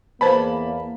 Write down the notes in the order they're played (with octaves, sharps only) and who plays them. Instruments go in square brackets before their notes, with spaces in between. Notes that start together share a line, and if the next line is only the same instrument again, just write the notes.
[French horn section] E2 A#3 [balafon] B4 C5 [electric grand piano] A5 B5